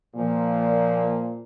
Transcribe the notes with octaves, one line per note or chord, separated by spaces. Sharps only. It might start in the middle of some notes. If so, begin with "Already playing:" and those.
A#2 F3